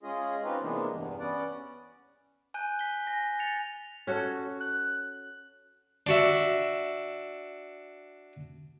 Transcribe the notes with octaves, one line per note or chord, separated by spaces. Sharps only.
G#3 C#4 F4 G#4 D#5
C4 C#4 D#4 F4 G4 B4
C3 E3 G#3 A#3 B3 D4
E2 G2
B3 C#4 D5 F#5
G#5 F#6 G6 D#7
B6 G7
G#5 A#6
A6 C#7 F7
C#4 F#4 A4
F#6
D4 F#4 E5